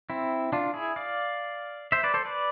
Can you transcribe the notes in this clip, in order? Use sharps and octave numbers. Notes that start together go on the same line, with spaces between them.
C4 E4
D4 F4
E4 G#4
D5 F5
C5 E5
B4 D5
A4 C5
B4 D5